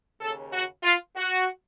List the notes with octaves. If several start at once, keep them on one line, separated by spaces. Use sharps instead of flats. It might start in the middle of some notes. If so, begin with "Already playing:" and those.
D#2 C#3 A4
F#4
F4
F#4